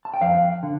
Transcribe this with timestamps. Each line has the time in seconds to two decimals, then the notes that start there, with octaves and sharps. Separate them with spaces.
0.05 A5
0.14 G5
0.21 F2 F5
0.63 D3